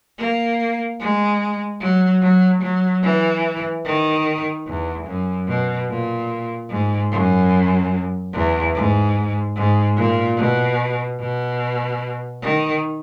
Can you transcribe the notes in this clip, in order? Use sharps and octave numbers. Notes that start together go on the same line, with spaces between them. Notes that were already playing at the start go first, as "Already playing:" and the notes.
A#3
G#3
F#3
F#3
F#3
E3
D#3
E2
F#2
B2
A#2
G#2
F#2
E2
G#2
G#2
A#2
B2
B2
D#3